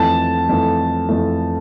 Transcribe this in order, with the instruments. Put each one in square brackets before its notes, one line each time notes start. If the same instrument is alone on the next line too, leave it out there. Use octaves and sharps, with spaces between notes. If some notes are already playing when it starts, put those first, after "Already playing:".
Already playing: [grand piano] F2 E3 A3 [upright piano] A5
[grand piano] F2 E3 A3
F2 E3 A3